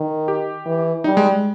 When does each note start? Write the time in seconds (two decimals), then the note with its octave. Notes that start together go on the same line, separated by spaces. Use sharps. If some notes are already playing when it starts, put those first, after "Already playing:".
Already playing: D#3
0.28 G4
0.66 E3
1.04 G3 D#4
1.17 G#3